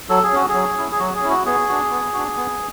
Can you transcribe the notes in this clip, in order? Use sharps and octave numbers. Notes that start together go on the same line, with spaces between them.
F#3 A4
G#4
C#4 F#4
G#4
F#3
C#4 E4
G#4
F#3 F#4
G#4
C#4 E4
F#4
B3 G#4
D4 F#4
B3
D4 F#4
B3